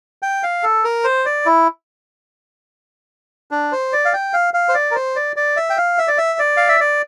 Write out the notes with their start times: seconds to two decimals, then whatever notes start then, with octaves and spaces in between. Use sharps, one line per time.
0.22 G5
0.43 F5
0.63 A4
0.84 A#4
1.04 C5
1.26 D5
1.46 E4
3.51 D4
3.72 C5
3.93 D5
4.05 F5
4.14 G5
4.34 F5
4.54 F5
4.69 C5
4.75 D5
4.91 A#4
4.95 C5
5.16 D5
5.36 D5
5.57 E5
5.70 G5
5.78 F5
5.99 E5
6.08 D5
6.18 E5
6.39 D5
6.57 F5
6.69 E5
6.80 D5